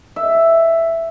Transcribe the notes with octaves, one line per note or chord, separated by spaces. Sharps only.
E5